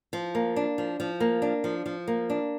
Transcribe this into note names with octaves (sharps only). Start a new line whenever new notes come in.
F3
A#3
D4
F3
F3
A#3
D4
F3
F3
A#3
D4